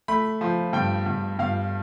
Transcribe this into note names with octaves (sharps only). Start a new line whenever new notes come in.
A3 B5
F3
G2 G5
G2
G2 F5